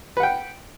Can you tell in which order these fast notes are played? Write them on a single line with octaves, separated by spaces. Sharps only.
B4 F#5 G5